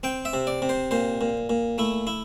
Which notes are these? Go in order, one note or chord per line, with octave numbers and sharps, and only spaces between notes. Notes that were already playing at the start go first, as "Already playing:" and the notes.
C4 G5
E5
C3
D5
C3
C5
A#2 C5
A#2
A#2
A3 E4
E4